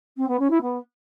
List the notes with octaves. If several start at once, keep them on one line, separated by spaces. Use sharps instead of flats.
C4
B3
C#4
E4
B3